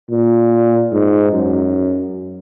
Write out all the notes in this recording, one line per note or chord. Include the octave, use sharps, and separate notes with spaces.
A#2
G#2
F#2